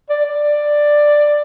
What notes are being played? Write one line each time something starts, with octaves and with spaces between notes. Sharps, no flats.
D5
D5